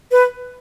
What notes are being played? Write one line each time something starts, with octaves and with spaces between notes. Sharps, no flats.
B4